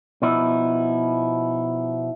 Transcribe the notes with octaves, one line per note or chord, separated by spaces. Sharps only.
B2 F3 B3 D#4 E4